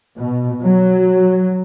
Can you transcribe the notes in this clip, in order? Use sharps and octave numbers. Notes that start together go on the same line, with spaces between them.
B2
F#3